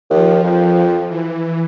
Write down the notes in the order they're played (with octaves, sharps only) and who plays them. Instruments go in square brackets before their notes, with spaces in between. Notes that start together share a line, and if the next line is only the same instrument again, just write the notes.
[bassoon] D#2 [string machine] F3
[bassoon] F2
[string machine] E3